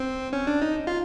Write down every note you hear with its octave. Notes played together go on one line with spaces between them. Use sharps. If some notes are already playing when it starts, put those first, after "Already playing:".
Already playing: C4
C#4
D4
D#4
F4